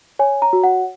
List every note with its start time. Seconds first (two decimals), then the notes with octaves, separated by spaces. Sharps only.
0.19 C#5 G#5
0.42 A#5
0.53 F#4
0.64 F#5